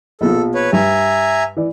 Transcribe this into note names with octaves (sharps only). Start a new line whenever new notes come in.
A#1 B2 F3 A4
B4 C#5
G2 E5 G#5 A#5
E3 D5